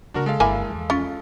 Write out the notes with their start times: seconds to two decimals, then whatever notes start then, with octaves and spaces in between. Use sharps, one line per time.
0.14 C#3 A#3 D4 F#4 A#4
0.26 G#3 A4 F5
0.40 G1 A#3 E4 G#5
0.70 E2 F3
0.90 C#4 F4